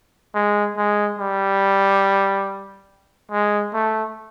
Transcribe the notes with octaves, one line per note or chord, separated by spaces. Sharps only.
G#3
G#3
G3
G#3
A3